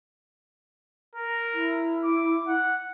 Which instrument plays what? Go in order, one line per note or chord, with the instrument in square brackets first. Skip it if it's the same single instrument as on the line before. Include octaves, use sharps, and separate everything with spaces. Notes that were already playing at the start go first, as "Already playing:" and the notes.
[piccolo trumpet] A#4
[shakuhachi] E4
[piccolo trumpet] D6
F#5